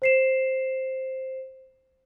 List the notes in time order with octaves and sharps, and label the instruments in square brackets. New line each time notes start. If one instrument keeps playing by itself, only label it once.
[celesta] C5 C7 E7